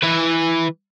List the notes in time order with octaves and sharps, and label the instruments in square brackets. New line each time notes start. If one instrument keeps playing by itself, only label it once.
[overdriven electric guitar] E3 B4